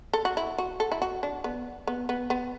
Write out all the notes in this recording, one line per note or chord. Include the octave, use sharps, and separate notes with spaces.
A4
F#4
E4
F#4
A4
E4
F#4
D4
B3
B3
B3
B3